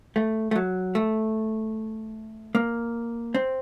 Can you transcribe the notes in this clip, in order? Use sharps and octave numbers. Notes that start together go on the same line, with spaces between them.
A3
A3
F#3
A3
A#3
C4